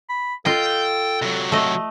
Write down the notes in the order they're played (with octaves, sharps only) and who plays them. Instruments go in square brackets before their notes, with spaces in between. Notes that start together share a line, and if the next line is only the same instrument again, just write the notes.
[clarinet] B5
[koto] F4 D#5 [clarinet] A4 [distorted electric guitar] G5
[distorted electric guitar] C3 F#3
[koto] A3 D#5